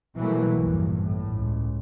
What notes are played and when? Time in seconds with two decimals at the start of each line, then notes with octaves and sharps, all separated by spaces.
0.17 B2 E3 F#3 G3 A3 A#3
0.56 A#1 E2 G2 A#2
1.00 A2
1.36 C#2